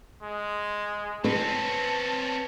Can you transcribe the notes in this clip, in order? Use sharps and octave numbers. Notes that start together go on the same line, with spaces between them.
G#3
C4 C#4 B4 A5